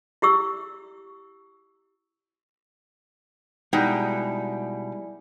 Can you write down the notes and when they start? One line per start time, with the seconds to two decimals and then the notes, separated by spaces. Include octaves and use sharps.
0.22 E4 G4 C#6 E6
3.73 B2 G3 G#3 D#4 E4 D5 G5 G#5